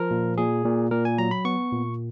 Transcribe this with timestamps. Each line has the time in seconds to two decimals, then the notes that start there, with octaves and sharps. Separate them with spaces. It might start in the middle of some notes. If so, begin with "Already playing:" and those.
Already playing: F3 A#4
0.11 A#2
0.38 A#2 G#4
0.65 A#2
0.91 A#2 A#4
1.05 G#5
1.18 F#3 A#5
1.31 B5
1.45 B3 C#6
1.72 A#2